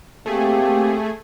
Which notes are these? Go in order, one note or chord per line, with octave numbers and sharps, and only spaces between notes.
A3 A#3 C4 G4 G#4